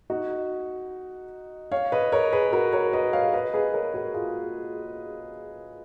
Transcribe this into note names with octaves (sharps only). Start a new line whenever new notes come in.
D#4 F#4
C#5 F5
B4 D#5
A#4 C#5
G#4 B4
F#4 A#4
A#4 C#5
B4 D#5
C#5 F5
B4 D#5
G#4 B4
A#4 C#5
F#4 A#4
F4 G#4